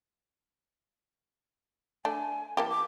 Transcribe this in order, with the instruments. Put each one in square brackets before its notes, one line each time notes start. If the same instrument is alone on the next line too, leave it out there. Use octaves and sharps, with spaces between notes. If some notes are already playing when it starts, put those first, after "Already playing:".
[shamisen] A3 D4 [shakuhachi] G#5
[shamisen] E3 A#3 G4 [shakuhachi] A5
[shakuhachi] D6